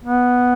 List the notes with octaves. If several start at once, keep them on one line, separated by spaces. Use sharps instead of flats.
B3